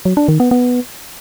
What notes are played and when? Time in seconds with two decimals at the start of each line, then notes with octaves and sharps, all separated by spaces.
0.05 F#3
0.17 D4
0.28 D#3
0.40 B3
0.51 B3